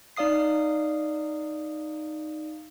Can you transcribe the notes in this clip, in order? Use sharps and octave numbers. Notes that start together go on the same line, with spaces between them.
D#4 D5 F5 D#6 C7